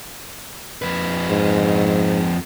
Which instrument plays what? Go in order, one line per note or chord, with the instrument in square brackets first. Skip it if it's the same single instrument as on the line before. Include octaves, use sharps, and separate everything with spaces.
[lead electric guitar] F2 B4
[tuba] G#2